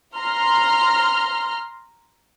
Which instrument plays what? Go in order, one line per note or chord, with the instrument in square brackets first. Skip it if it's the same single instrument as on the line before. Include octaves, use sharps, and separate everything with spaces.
[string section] A#5 C6 F6